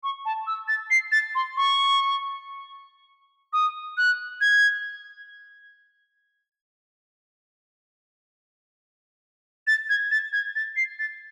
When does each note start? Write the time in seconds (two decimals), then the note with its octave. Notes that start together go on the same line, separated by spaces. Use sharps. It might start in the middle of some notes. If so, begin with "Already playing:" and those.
0.04 C#6
0.25 A5
0.47 E6
0.68 A6
0.91 C7
1.12 A6
1.35 C6
1.57 C#6
3.53 D#6
3.97 F#6
4.41 G#6
9.67 A6
9.90 G#6
10.11 A6
10.33 G#6
10.56 A6
10.76 C7
10.99 A6